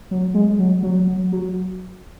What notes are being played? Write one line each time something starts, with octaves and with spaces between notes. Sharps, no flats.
F#3
G#3
F#3
F#3
F#3
F#3